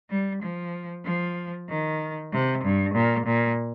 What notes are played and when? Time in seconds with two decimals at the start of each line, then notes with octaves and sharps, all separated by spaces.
0.10 G3
0.43 F3
1.05 F3
1.69 D#3
2.32 C3
2.64 G2
2.94 A#2
3.26 A#2